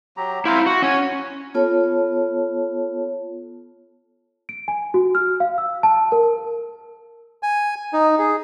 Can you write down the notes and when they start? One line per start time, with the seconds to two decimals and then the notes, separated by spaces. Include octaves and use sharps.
0.17 F#3 G4 A#5
0.45 E4 C5 E5 F5 A#5
0.66 F#4 F#5
0.82 C#4
1.54 B3 F4 A4 C#5 A5
4.49 D7
4.68 G#5
4.94 F#4
5.15 F6
5.40 F5
5.58 E6
5.83 A5
6.12 A#4
7.43 G#5
7.93 D#4
8.19 G#4